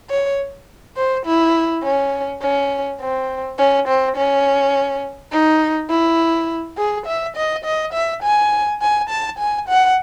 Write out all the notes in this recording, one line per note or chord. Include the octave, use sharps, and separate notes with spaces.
C#5
C5
E4
C#4
C#4
C4
C#4
C4
C#4
D#4
E4
G#4
E5
D#5
D#5
E5
G#5
G#5
A5
G#5
F#5